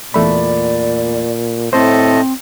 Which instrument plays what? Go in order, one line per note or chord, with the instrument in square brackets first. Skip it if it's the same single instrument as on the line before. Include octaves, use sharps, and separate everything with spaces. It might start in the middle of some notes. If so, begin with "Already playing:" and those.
[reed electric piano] E2 A3 B5 [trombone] A#2 [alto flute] D5
[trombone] A2 [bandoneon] A3 A4 D#5 [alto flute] C4 [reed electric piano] C5